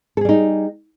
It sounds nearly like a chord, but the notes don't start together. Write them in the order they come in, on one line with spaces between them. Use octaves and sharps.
A4 G#4 G3 D#4